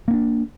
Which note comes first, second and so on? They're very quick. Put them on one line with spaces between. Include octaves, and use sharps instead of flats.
A#3 C#4 D4